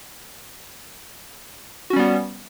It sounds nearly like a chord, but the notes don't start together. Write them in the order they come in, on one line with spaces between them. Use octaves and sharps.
F#4 C#4 G3 B3